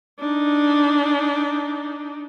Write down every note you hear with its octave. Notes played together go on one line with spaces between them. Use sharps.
D4 D#4